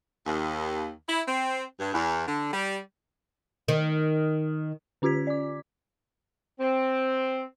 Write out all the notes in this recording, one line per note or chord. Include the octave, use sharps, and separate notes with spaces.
D#2
E4
C4
G2
E2
D3
G3
D#3
D3 C#4 F4 G4 G#6 B6
D5 D6
C4